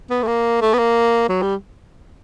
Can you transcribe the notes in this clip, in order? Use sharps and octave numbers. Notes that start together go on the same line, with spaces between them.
B3
A3
A#3
A3
B3
A#3
F#3
G3